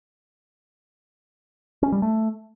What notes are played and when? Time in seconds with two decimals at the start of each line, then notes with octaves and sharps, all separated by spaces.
1.83 C#4
1.92 G3
2.02 A3